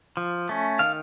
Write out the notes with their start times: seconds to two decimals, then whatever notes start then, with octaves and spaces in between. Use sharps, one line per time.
0.17 F3
0.49 A3 C#4
0.79 D#3 F5